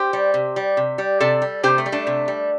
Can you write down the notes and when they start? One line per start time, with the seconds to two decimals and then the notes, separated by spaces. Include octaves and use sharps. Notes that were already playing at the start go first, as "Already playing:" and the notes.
Already playing: G4 C5
0.13 G3
0.34 C3
0.56 G3
0.77 C3
0.98 G3
1.20 C3 A4 D5
1.42 G3
1.63 C3 G4 C5
1.78 A3
1.86 G3
1.92 A3 D4
2.07 C3
2.28 G3